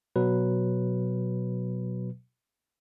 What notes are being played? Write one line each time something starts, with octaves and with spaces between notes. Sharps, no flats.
B2 F#3 B4